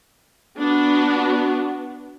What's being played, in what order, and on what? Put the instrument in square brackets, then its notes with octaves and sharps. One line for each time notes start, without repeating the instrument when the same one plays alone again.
[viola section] B3 D4 F#4